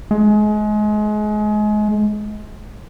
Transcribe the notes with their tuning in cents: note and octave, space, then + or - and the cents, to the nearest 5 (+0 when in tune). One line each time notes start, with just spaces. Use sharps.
G#3 +30